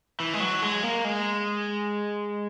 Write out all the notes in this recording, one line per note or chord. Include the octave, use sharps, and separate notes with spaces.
E3
G#3
F#3
G#3
A#3
G#3